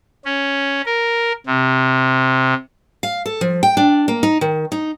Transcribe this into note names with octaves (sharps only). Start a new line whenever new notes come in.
C#4
A#4
C3
F5
A4
F3
G5
D4
A#3
D#4
D#3
D#4